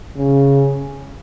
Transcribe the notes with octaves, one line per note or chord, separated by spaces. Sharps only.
C#3